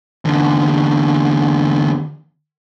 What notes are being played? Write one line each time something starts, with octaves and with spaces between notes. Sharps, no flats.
E2 D3